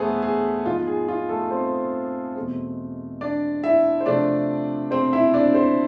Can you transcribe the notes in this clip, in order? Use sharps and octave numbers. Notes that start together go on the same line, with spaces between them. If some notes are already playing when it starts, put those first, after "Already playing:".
Already playing: E2 A3 B3 G#4 A4 B4 C5
G#4
G#2 F3 B3 F4
G#4
F4
A3 A4
C4 C5
E2 B2 A3 C4
D4 D5
E4 E5
C5
C3 F3 A3 C4 D4 D5
C4 C5
E4 E5
D4 D5
C4 C5